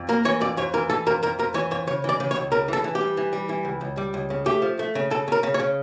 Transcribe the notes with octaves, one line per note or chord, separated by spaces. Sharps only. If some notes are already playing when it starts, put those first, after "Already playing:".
Already playing: F2
A#3 A#4
E3 C#5
F2 D5
F2 C#5
E3 A#4
E3 A4
F2 A#4
F2 A#4
F2 A#4
E3 C#5
F2 C#5
C#3 C#5
E3 D5
C#3
C#5
C#2
C#3 A#4
E3 A4
E3
G4
G3
E3
G3
E3
C#2
C#2
G3
C#2
C#3
A3 G4
F3
A3
C#3
C#3 A4
C#3 A#4
C#3
C#5
C#3